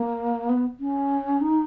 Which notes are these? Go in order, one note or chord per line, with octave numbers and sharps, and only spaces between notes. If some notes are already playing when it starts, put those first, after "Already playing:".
Already playing: A#3
B3
C#4
D#4